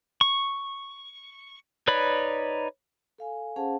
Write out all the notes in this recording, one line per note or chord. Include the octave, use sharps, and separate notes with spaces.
C#6
D#4 B4 C#5 D5 B5
A4 F5 G#5
C#4 G#4 C5 F5 F#5 A5